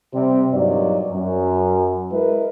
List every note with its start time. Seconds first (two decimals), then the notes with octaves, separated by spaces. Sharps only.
0.14 C3 G3 C4
0.52 G2 A#2 F#3 D#4 D5
1.11 F#2
2.12 G#3 E4 A#4 B4 D#5